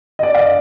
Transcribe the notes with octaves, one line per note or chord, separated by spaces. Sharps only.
D#5
D5
F5
D#5